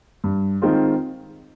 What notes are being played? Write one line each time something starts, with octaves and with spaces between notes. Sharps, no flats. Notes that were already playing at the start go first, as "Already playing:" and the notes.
G2
D#3 G#3 C4 F4